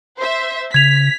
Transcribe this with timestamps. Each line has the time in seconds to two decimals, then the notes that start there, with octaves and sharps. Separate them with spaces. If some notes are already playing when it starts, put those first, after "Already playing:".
0.20 C5 E5
0.74 C#3 G#6 B6 F7